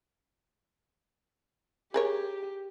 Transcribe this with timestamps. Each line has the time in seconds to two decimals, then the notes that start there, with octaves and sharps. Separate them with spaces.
1.94 G4 G#4 A#4 C#5